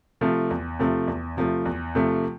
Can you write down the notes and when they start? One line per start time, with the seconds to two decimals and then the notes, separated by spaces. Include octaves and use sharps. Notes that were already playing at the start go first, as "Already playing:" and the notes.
0.21 C3 F3 A3
0.51 E2
0.79 C3 F3 A3
1.08 E2
1.37 C3 F3 A3
1.65 E2
1.95 C3 F3 A3